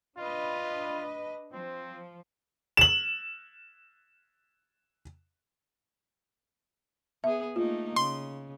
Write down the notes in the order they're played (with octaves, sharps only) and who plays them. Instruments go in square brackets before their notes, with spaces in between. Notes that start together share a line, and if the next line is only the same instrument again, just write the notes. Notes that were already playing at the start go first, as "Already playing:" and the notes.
[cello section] D4 B4 D#5 [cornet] F4
[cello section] F3 [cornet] C4
[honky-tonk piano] E7 F#7
[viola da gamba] B3 G#4 [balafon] E5
[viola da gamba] A3 A#3 D#4 [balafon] F4
[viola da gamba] C#3 [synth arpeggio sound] C6